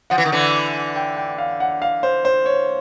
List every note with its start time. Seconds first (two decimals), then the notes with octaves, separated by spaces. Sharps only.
0.10 F3 F#5
0.18 E3
0.25 D#3
0.32 D3 E3
0.96 G5
1.17 G5
1.38 F5
1.60 F#5
1.82 F5
2.03 C5
2.25 C5
2.46 C#5